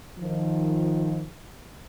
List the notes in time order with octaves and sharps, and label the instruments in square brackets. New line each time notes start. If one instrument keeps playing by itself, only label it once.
[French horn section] D#3 F3